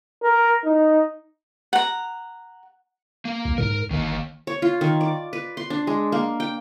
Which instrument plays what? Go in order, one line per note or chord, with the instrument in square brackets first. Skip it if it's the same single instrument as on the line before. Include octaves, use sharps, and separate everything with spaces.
[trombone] A#4
D#4
[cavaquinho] F#5 A#5
[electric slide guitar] A#3
[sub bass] B1
[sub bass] G#2 [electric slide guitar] A#4
[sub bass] G1 [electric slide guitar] D#3 A#3
[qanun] C#5
F4
D#3
D5
B4
C6
D4
G#3
A#3
G5